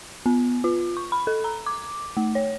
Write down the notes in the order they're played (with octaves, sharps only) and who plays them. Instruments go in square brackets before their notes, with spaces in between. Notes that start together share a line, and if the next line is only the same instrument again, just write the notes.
[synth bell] B3
F4
C#6
B5
A4
A#5
D6
A3
C#5